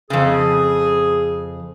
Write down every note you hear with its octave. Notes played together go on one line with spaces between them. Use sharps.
F2 C#3 G#4